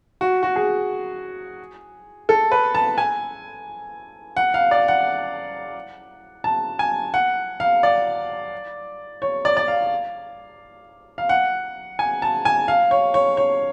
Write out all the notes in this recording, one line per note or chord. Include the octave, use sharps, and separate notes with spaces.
F#4
F#4
G#4
A4
B4
A5
G#5
F#5
F5
D5
F#5
A5
G#5
F#5
F5
D5
C#5
D5
D5
F5
F5
F#5
G#5
A5
G#5
F5
C#5
C#5
C#5